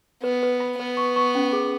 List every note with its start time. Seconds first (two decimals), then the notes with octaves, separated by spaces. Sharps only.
0.23 B3 B4
0.43 B4
0.60 B5
0.79 B3 B4
0.97 C#6
1.16 C#6
1.35 C#4
1.53 G#4